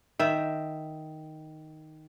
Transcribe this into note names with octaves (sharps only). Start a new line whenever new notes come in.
D#3 E5